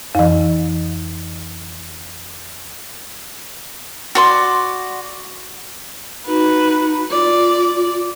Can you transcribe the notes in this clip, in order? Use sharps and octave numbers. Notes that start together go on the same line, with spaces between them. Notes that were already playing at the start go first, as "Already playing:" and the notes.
F2 E3
F#4 D5 C6
D#4 F#4 B4
F4 D5